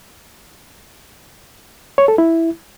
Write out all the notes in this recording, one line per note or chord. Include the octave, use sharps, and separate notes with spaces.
C#5
A4
E4